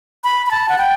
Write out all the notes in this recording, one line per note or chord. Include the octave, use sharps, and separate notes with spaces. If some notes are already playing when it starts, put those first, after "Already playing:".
B5
B5
A5
F#5
G5